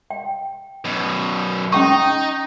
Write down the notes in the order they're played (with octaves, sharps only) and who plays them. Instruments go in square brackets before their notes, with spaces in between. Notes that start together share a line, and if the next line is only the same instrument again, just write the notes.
[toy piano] G5
[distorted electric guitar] F#2 B2
[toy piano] C#4 G5 C#6 [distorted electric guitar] D#4